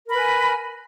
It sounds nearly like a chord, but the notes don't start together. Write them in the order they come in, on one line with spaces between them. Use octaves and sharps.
A#4 B5 B4 G#5